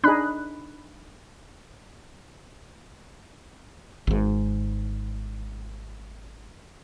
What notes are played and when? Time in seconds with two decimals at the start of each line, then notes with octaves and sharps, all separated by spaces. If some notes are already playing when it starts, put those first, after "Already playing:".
0.04 D4 D#4 G#4 B5 F#6
4.07 G#1 G#2